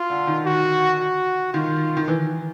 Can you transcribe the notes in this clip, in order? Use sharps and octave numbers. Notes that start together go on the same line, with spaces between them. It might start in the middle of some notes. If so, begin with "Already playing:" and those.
Already playing: F4
D3
D#3
F#4
F#4
D#3 F4
D#3
E3